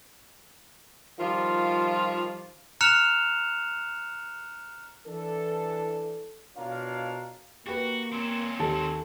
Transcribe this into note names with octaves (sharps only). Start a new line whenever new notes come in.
D#3 F3 G3 F4
A#5 F6 F#6 C#7 E7 F7
E3 D4 A4
B2 D4 F4 A#4 C#5 F5
A#3 F#4 G4 B4
C4 C#4
D#2 D#3 A4